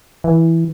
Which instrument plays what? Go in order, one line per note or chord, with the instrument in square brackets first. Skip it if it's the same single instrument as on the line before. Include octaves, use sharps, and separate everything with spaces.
[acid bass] E3